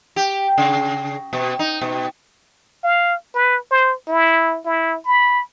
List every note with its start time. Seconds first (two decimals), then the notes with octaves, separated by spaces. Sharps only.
0.16 G4
0.58 C#3
1.33 B2
1.59 D#4
1.81 B2
2.84 F5
3.34 B4
3.71 C5
4.07 E4
4.65 E4
5.05 B5